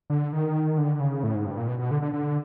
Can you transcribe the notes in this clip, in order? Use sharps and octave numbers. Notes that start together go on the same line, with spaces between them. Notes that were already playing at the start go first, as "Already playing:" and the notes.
D3
D#3
D3
C#3
A2
G#2
G2
A#2
B2
B2
D3
D3
D3